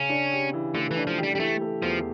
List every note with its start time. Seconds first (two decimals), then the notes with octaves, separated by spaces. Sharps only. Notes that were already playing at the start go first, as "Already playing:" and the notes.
Already playing: C#3 C#4
0.09 D4
0.32 G4
0.53 E3
0.75 D3 A3
0.91 E3
0.96 D4
1.07 F3
1.18 G4
1.23 G3
1.35 G3
1.39 E3 A3
1.61 A3
1.82 E2 F3